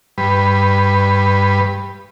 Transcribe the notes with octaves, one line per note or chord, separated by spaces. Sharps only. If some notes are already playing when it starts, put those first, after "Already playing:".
G2 B4